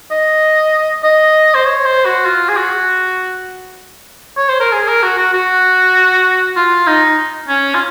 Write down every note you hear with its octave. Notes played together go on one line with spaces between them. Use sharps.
D#5
D#5
C5
C#5
C5
F#4
F4
G#4
F#4
C#5
C5
A#4
G#4
A#4
F#4
F#4
F#4
F4
D#4
C#4
F4